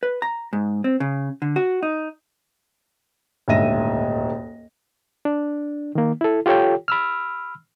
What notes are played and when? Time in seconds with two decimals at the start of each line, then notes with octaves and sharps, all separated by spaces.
0.03 B4
0.22 A#5
0.53 G#2
0.84 C4
1.00 C#3
1.42 D3
1.56 F#4
1.83 D#4
3.48 D#1 D2 G#2 E5 A#6 D#7
5.25 D4
5.95 D#3 A#3
6.21 E4 A4
6.46 F4 G4 A4 C#5 G5
6.88 B5 E6 F6